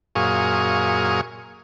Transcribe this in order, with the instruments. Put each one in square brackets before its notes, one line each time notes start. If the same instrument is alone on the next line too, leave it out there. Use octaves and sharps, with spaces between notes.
[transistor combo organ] F#2 A#2 G#4 F5 C#6 D#6